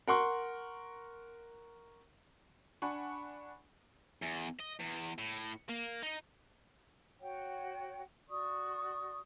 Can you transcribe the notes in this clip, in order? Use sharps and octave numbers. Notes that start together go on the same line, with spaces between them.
A#4 F#5 C6 C#6
D4 F#5 G#5 B5 C#6
E2
D#5
E2
A2
A#3
D#4
F#4 C#5 F#5 G5
F#4 D5 C#6 D#6